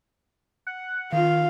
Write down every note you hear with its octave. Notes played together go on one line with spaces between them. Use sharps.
F#5
D#3 F4 F5